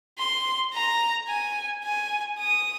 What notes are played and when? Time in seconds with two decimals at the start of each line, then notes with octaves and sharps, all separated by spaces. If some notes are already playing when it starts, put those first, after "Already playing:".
0.19 C6
0.74 A#5
1.28 G#5
1.84 G#5
2.39 D#6